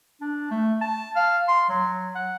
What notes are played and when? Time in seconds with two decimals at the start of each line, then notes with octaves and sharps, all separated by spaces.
0.21 D4
0.51 A3
0.81 A5
1.16 F5
1.48 C6
1.70 F#3
2.15 F#5